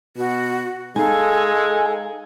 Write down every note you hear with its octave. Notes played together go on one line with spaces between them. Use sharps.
B2 F#4
G#3 D#4 A4 F5 G#5